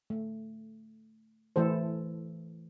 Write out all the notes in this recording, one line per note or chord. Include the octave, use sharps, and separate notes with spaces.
A3
E3 A3 A4 C5